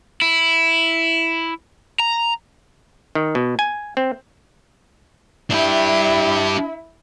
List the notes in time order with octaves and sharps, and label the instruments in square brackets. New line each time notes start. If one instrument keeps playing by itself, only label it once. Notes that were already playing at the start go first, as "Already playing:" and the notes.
[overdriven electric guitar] E4
A#5
[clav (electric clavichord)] D#3
B2
G#5
C4
[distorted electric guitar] D4 G4 [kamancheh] E4 E5